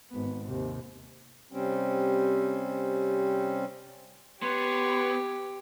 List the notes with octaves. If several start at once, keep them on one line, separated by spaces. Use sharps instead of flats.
G#1 B3
D#2 C3
C3 G3 C4 C#4
B3 G4 C#5 C6